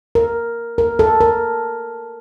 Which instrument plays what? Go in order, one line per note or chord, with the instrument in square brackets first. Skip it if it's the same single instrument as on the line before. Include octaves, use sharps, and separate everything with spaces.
[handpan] A#4
A#4
A4
A#4